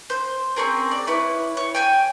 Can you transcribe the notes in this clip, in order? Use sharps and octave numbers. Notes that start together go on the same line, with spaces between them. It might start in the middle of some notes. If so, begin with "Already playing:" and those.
C5
C4 C#4 G#4 A#4
D5
C#4 E4 B4
C#5
G5 G#5 G6